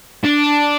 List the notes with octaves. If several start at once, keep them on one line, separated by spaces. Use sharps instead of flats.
D4